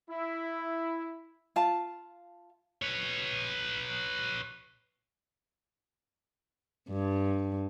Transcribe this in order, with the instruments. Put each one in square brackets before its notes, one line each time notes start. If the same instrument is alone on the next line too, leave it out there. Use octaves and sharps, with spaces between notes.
[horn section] E4
[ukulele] F4 F5 A5
[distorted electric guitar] B4 C#5
[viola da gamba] G2